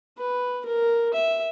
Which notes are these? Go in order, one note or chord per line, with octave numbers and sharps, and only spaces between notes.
B4
A#4
E5